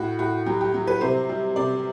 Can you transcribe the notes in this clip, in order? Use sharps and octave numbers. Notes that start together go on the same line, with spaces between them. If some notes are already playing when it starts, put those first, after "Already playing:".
Already playing: A2 F#4
A2 F#4
F#3 G4
G4
F#3
B4
C3 C5
G3
C3 D5